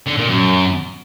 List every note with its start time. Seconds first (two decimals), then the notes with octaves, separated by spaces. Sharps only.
0.07 D3
0.17 A#2
0.28 F#2